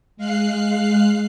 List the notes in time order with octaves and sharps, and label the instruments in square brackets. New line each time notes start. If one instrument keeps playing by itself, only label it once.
[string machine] G#3 F5 F#6 C7